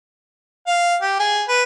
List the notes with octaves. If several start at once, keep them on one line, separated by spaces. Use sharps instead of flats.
F5
G4
G#4
B4